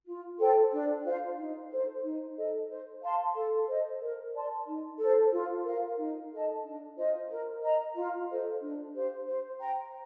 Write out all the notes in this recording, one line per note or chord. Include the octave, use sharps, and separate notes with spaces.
F4
A4 C5 G5
D4
F4 C5 F5
D#4
A4 C5
D#4
A4 D#5
C5
F5 A5 C6
A4
C5 D#5
A#4
D5 A5 C6
D#4
A4 C5
F4
A#4 F5
D#4
A4 D#5 A5
D4
F4 C5 D#5
A#4
D#5 A#5
F4
A4 C5 D#5
D4
G4 C5 F5
C5
G5 A#5